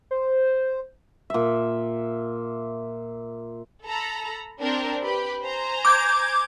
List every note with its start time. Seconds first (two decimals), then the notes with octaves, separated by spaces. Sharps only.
0.11 C5
1.30 A#2 E5
3.83 A4 A#5 B5
4.60 C4 D4 A#4
5.01 G4 B4 B5
5.42 C5 G#5 A#5
5.85 D6 G6 G#6